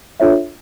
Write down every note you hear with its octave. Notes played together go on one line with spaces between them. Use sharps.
D4 F4 A4 C#5 E5